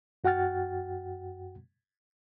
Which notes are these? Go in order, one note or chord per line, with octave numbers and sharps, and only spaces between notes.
F#2 F#4 F#5 G5 F6 A6